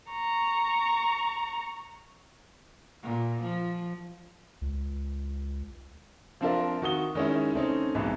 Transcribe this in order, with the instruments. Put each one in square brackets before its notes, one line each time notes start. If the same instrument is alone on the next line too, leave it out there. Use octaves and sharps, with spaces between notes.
[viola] A#5 C#6
[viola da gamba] A#2
F3
[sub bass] C#2
[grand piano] F3 C4 D4 F4 A#4 E5
D#3 F#4 D#6 G7
D#3 G#3 C#4 D#4 E4
A3 C4 C#4 D#4
B1 G#2 B2 E3